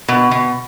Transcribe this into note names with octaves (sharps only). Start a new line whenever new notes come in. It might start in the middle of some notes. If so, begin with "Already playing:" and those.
B2
B2